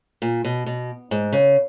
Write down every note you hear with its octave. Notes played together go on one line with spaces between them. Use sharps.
A#2
B2
B2
G#2
C#3